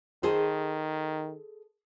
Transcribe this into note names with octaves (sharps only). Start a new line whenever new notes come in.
D#3 G#4 A4 C5